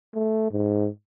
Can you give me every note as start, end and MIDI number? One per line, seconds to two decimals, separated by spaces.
0.15 0.51 57
0.51 0.88 44